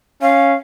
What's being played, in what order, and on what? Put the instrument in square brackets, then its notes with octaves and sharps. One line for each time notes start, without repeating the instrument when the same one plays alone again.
[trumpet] C#4 [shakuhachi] F5